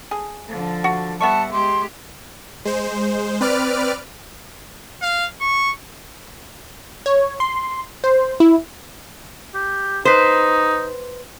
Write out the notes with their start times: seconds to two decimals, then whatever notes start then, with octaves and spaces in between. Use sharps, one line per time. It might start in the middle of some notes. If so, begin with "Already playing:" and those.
0.11 G#4
0.48 D3 F3
0.84 F#4
1.21 G3 B3 E5 F#5 A5 C#6
1.53 G#3 G4 C6
2.65 G#3 C5
3.41 C4 B4 D5 F6 D7
5.02 F5
5.41 C#6
7.06 C#5
7.40 C6
8.04 C5
8.40 E4
9.55 G4
10.05 D#4 B4 C5